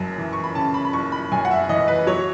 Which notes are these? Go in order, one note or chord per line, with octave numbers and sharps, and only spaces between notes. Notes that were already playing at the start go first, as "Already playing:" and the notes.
Already playing: F#1 F#2
E3
C#6
B5
C#3 A5
B5
B5
F#1 C#6
B5
F#2 G#5
F#5
E5
E3 D#5
B4
F#3 C#5